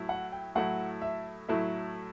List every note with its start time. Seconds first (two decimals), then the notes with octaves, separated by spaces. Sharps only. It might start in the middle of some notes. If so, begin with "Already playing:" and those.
Already playing: A2 F#3 E4
0.09 F#5
0.32 G5
0.55 A2 F#3 A3 E4 F#5
1.02 E5
1.48 A2 F#3 A3 E4 E5